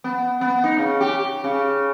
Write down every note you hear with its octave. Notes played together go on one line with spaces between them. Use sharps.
B3
B3
D#4
C#3
G4
C#3